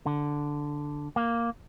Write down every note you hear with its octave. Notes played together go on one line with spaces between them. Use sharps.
D3
A#3